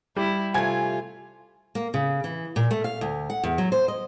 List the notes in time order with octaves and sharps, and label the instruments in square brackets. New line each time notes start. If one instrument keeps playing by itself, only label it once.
[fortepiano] G3 [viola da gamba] E4
[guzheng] C3 A3 [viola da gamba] F4 [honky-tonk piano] G#5 G#6
[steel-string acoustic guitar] A#3
C#3
E3
A#2
A3
F5
D2
F#5
E2
F#3
C5
D#5